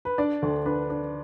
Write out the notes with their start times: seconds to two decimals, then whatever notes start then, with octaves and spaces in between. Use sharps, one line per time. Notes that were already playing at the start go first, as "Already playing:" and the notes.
0.05 B4
0.18 D4 D5
0.42 D2
0.65 D4 B4
0.90 D4